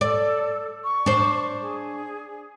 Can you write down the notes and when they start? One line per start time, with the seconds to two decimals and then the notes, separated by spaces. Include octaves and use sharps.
0.01 A4 D5
0.84 C#6
1.06 D4 C5
1.61 G#4